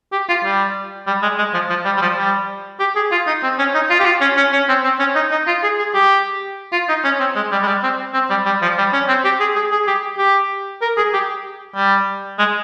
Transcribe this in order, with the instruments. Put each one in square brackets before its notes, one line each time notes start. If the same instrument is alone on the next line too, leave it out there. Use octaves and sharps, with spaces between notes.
[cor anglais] G4
F4
G3
G3
G#3
G#3
F3
F3
G3
G3
F3
G3
G4
G#4
F4
D#4
C4
C#4
D#4
F4
G4
F4
C#4
C#4
C#4
C4
C4
C#4
D#4
D#4
F4
G#4
G#4
G4
F4
D#4
C#4
C4
G#3
G3
G#3
G3
C4
C4
G3
G3
F3
G3
C#4
C4
G4
G#4
G#4
G#4
G4
G4
A#4
G#4
G4
G3
G#3